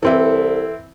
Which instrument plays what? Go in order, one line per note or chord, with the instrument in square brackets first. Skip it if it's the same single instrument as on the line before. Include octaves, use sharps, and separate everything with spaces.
[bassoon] C2 [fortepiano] E3 C4 E4 [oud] A4 B4 D5